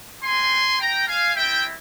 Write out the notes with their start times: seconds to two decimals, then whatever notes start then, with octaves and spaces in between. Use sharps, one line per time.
0.23 G#3 C4 G4 G#5 C6
0.80 G5 A#5
1.07 F5 G#5
1.36 G3 C4 E4 E5 G5